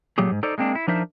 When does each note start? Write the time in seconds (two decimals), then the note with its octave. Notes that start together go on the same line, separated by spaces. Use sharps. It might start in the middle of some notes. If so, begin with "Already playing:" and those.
0.18 A#2 F#3 A3 G4 G#4
0.31 G#2
0.43 D#4 A4 C5 D5
0.58 G#3 A#3 C4 D4
0.75 E4
0.88 F3 D4 D#4 A#4 C5 E5